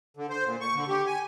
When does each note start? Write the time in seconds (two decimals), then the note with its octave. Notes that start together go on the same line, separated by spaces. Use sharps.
0.17 D3
0.30 C5
0.44 A#2
0.61 C#6
0.75 D3
0.88 G4
1.06 G#5